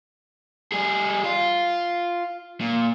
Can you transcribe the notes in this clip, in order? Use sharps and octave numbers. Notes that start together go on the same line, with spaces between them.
G3 G#4
F4
A#2